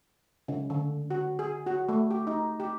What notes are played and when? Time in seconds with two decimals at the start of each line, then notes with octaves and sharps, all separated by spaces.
0.48 C#3
0.70 D3
1.11 F#4
1.39 G#4
1.66 F#4
1.89 A3
2.10 G4
2.27 D#4
2.60 G4